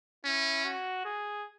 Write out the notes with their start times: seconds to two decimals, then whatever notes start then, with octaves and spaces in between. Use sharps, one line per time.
0.24 C#4 E4
0.64 F#4
1.05 G#4